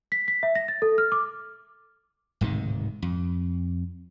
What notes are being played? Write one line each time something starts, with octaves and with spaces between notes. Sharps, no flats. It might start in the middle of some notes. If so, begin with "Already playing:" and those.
B6
B6
E5
A#6
A6
A4
F6
D6
D1 G#2 C3 D#3
F2